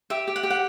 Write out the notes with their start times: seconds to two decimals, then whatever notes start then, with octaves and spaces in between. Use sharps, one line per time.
0.10 G4 E5
0.28 G4
0.36 F#5
0.43 G4
0.50 F#5